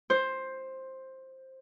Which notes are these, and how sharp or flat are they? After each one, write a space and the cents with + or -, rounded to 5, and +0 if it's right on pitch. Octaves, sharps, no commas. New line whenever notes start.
C5 +10